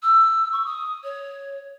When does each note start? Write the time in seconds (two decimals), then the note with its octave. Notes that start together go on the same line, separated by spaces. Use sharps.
0.03 E6
0.53 C#6
0.66 D#6
1.04 C#5